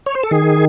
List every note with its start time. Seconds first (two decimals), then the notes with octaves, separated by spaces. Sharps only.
0.06 C#5
0.15 C5
0.23 A4
0.31 D#3 G#4